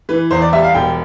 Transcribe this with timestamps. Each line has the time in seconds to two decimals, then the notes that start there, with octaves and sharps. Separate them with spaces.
0.09 E3 B4
0.31 E2 C5
0.42 D5
0.53 G3 E5
0.64 F5
0.75 E1 G5